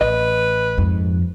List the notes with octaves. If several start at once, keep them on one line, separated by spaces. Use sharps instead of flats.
A1 B4 D#5
F2 G#2